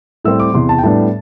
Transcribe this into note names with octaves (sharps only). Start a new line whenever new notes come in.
A2 G3 C4 E6
D6
E2 C3 E3 C6
A5
G5
A2 G3 B3 D4 A5